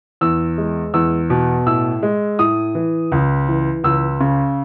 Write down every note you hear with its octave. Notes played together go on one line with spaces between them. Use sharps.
E2 E6
G#3
E2 E6
B2
A2 E6
G#3
A2 D#6
E3
C#2
E3
C#2 E6
C#3